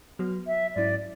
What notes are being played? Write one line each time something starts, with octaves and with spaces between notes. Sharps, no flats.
F#3 B3 F#4
E5
G#2 F#3 C#4 E4 D5